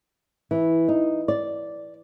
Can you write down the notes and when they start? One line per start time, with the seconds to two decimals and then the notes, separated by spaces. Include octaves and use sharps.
0.51 E3
0.89 D#4
1.28 D5